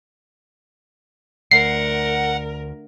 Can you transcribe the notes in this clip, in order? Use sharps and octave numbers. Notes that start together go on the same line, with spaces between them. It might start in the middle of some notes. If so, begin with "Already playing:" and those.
D2 A#4 F#5 C7